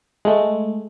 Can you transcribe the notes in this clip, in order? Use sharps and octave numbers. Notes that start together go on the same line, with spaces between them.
G#3 A3